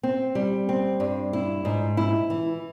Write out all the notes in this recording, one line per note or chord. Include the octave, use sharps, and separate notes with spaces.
C4
G3
C4
G2
E4
G#2
E4
E3